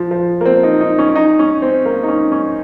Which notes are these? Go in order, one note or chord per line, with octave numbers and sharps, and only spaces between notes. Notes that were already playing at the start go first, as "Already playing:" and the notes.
Already playing: F3
F3
A#3
C4
D#4
D#4
C#4
D#4
C#4
C4
A#3
D#4
C#4
C#4